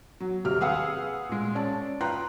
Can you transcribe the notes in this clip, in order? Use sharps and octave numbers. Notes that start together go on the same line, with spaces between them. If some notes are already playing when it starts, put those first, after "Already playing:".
F#3
D#1 C3 G4 F6
G#4 B4 F5 F#5 E6
A#2 G#3
C#4 D5 A5
F4 B4 G5 A#5 C6 F#6